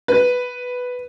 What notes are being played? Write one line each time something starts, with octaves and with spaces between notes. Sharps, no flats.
B4